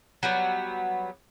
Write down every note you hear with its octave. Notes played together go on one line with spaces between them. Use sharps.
F#3 G3 B3